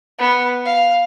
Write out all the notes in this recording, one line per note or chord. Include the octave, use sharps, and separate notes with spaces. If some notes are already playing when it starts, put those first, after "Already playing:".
B3
F5